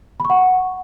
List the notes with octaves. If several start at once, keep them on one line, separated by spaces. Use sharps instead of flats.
B5
C#6
F#5